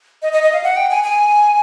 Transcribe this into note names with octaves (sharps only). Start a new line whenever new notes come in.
D#5
D#5
D#5
F5
F#5
G5
G#5
G#5